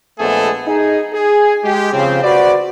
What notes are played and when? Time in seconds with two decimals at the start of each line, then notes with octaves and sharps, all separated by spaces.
0.19 A#1 G#3 A3 B3 G#4 A4
0.66 D#4 G#4
1.12 G#4
1.63 G#3 G4
1.93 C#3 F3 C4
2.23 F#4 B4 C5 D5